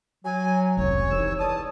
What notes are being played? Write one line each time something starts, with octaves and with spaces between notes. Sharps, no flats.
F#3 G#5
F1 C#2 C#5
C2 E3 D#4 E6
E2 D5 A5 D#6